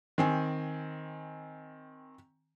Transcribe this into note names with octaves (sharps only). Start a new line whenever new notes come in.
D#3 C4 G#5